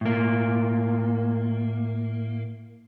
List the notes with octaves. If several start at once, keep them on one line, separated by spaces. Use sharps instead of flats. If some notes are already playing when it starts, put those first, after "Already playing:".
A2 A#3